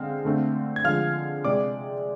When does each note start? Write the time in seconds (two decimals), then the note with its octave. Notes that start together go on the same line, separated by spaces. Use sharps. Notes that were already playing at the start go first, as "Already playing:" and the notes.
Already playing: D3 G#3 C4 F5
0.25 D3 A3 C4
0.76 G#6
0.84 D3 F3 G#3 F5 F6
1.45 C3 G#3 C4 D5 D6